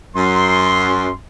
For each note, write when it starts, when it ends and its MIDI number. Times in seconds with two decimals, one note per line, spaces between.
0.15 1.11 42
0.15 1.11 84